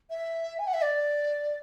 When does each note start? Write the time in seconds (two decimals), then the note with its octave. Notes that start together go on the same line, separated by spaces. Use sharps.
0.10 E5
0.59 G#5
0.67 F#5
0.74 E5
0.82 D5